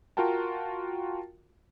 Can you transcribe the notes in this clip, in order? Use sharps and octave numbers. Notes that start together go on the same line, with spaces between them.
F4 F#4 A#4 G5 A5